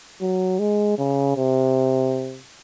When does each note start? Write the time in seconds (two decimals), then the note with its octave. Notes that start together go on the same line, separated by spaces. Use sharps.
0.21 F#3
0.59 G#3
0.98 C#3
1.36 C3